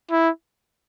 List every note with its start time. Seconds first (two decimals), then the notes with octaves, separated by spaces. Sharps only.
0.11 E4